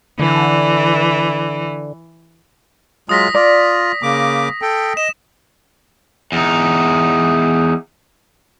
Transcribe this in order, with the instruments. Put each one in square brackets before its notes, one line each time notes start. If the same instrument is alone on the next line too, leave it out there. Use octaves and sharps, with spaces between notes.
[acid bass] D3 [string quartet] E3
[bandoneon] F#3 G#3 F4 [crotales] D#6 A#6 B6
[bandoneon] F4 [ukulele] D5
[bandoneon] C#3 A#3 D6
A4 G5
[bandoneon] D#5 [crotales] E7
[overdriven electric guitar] E2 D#4